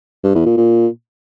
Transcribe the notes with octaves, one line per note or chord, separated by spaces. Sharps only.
G2
E2
A#2
A#2